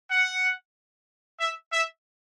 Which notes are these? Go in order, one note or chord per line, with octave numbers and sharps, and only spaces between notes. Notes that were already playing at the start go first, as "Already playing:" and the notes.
F#5
E5
E5